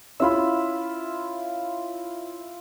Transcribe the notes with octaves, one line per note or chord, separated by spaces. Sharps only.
C#4 E4 F4 E5 B5